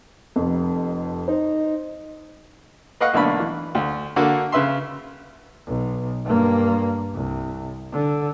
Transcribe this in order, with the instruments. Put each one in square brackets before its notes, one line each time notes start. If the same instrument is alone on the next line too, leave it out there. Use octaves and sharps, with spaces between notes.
[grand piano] F1 F2
[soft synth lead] D#4 [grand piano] C5
[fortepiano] B4 D#5 F5 F#5 C#6
B1 D3 A3 A#3 D4 B5
E3
D2
D3 A#3 F#4 A4
C#3 B4 E5 C6
[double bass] B1
G2 A#3
C2
D3